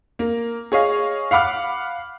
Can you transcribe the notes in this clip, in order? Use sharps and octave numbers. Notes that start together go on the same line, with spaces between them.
A#3
G#4 C#5 D#5 F5
F5 F#5 B5 D6 F6